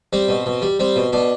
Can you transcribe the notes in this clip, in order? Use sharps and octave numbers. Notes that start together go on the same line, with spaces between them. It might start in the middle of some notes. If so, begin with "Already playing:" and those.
G3 C4
B2
B2
G3
G3 C4
B2
B2 D4